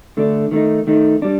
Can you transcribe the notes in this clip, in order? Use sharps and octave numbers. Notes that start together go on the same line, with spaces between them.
D3 A3 D4
D#3 A3 D#4
D#3 A3 D#4
G3 D4